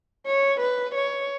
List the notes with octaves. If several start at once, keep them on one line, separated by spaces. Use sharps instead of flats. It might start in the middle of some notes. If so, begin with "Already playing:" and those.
C#5
B4
C#5